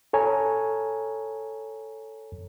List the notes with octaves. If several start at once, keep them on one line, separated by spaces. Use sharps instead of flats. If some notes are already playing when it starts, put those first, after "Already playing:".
A4 C#5 G#5 A#5